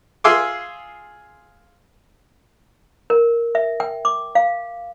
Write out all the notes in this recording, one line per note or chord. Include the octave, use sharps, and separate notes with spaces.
F4 G#4 E5 G#5 C6 D6
A#4
E5
G5
D6
F5